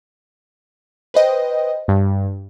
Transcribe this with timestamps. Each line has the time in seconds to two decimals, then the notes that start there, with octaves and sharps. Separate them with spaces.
1.14 B4 C5 D#5 G5
1.88 G2